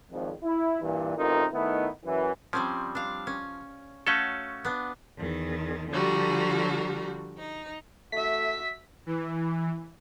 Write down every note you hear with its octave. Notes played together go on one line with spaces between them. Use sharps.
G#1 F2
E4
G2 A#2 E3
A1 C3 D#4 F4 A#4
D#3 A3 B3 D#4 E4
F#2 E3
F3 G3 C4 C#4
D4 F5
C#4
A3 C#4 F#4 A4 C#5 F5
B3 D4
E2 D#3
D3 F3 G3 F#4 A#5
D#4
A3 F#4 E5 B6
E3